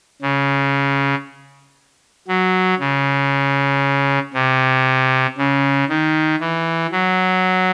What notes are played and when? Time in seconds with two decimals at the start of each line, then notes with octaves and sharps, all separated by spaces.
0.22 C#3
2.28 F#3
2.79 C#3
4.34 C3
5.38 C#3
5.89 D#3
6.40 E3
6.92 F#3